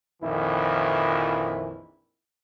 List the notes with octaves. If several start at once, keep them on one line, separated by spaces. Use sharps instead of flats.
A#1 F2 D#3 E3 E4